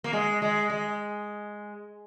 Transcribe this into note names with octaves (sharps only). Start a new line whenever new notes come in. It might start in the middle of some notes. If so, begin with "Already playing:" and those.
A#3
G#3
G#3
G#3